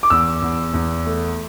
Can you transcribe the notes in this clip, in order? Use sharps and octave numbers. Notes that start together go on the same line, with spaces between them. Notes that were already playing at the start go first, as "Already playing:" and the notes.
D6
E2 E6
E2
E2
A3